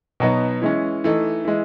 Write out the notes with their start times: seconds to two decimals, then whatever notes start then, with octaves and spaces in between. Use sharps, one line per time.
0.20 B2 F#3 B3 D#4
0.62 E3 G#3 C#4
1.04 E3 A3 D#4
1.45 E3 G#3